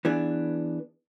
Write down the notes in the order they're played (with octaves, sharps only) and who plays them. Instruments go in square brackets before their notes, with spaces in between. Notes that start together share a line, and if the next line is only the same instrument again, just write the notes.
[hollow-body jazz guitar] E3 B3 D4 G#4